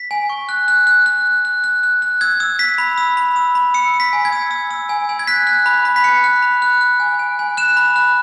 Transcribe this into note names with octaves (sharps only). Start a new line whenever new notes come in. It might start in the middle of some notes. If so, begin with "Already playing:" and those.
Already playing: B6
G#5
C#6
F#6
F#6
F#6
F#6
F#6
F#6
F#6
F#6
F#6
E6 G#6
E6
E6 B6
B5
E6
B5
E6
B5
E6 C#7
E6
B6
G#5
G#6
E6
E6
E6
G#5
G#5
G#6
F#6 B6
F#6
B5
B5
B6
F#6 C#7
F#6
B5
F#6
F#6
G#5
G#5
G#5
F#6 E7
B5
F#6